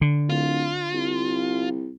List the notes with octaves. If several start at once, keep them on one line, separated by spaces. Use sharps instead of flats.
D3
D1 F4
C2